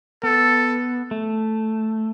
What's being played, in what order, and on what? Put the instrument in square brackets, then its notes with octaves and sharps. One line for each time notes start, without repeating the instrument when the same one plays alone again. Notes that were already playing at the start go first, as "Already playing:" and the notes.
[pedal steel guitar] B3 [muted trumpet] A4
[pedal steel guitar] A3